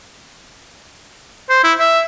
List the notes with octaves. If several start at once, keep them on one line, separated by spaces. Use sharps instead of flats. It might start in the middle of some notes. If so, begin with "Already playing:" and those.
C5
E4
E5